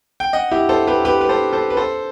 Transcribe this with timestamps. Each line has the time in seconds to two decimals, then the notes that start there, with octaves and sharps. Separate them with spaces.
0.20 G5
0.33 D#5 F#5
0.51 E4 G4
0.69 A4 C5
0.87 G4 B4
1.05 G4 B4
1.21 B4
1.29 A4 C5
1.53 A4 C5
1.70 B4
1.77 A4 C5